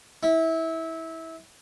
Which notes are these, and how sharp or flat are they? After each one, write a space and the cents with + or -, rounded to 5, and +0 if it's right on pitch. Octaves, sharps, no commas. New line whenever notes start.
E4 -20